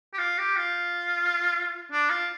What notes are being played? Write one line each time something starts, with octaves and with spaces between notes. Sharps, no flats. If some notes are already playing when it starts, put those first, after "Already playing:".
G4
F4
G4
F4
D4
F4